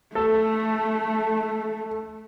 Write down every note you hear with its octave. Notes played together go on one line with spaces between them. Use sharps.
A3 A4